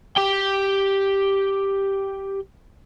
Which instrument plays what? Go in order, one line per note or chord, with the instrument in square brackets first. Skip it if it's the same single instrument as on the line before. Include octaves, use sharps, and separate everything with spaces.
[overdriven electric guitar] G4 G5